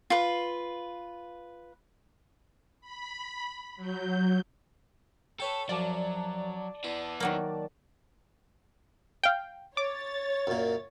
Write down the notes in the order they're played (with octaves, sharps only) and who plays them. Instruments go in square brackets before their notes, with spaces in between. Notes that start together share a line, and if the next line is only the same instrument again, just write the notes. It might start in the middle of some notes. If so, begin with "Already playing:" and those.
[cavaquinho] F4 B4
[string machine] B5
F#3 G6
[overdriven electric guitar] A4 [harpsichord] B4 C#5 G5
[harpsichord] F#2 F3 [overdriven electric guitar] F#3 [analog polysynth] D5 A5
[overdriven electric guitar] E3 B3 [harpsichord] E4
[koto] D#3 F#3 A#3
[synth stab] F5 G5
[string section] C#5 A6 [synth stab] D6
[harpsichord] F#2 A#2